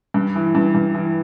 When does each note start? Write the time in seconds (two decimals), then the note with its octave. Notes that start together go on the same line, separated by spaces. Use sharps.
0.14 G2
0.35 E3
0.55 G2
0.75 G2
0.94 E3